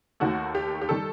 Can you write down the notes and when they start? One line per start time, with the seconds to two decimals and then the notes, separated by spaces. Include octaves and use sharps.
0.20 D#2 D#3 A3 F#4
0.55 G4
0.81 G4
0.89 D#3 G3 A4